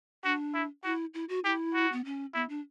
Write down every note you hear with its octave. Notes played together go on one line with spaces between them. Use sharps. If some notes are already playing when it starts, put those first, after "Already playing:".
D4 F#4
E4
E4 F#4
E4
F#4
E4 G4
F#4
B3
C#4
B3 E4
D4